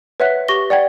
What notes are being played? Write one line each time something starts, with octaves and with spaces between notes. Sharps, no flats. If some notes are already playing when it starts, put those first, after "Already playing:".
B4 C#5 E5 F#5 F#6 B6
G4 C#6 A#6 G7
D5 F#5 G5 G#6